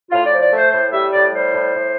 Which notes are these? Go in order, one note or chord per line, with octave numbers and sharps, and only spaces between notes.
A2 F4
D5
F3
D5
A3
C5
A2 C5
G3 E5
A2 D5
G3 C5
A2
A2